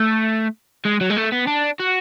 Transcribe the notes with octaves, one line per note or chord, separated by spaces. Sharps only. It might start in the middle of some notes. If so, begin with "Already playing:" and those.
Already playing: A3
G#3
F#3
G#3
A3
B3
D4
F#4